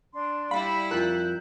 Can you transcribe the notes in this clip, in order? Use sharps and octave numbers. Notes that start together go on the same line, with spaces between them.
D4 C6
G3 E4 F5 B5
F2 F4 A#4 F#6 G6